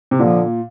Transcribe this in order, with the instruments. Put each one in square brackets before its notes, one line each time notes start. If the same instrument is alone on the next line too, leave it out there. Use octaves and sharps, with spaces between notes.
[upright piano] C3
[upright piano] A#2 [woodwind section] D3 F3 A#3